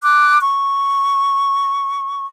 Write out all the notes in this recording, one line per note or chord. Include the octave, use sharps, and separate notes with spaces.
D6 F#6
C#6